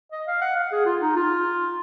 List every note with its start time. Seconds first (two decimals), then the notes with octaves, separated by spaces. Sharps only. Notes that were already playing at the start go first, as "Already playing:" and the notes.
0.12 D#5
0.27 F5
0.41 F#5
0.56 F5
0.72 G#4
0.86 F4
1.01 D#4
1.16 F4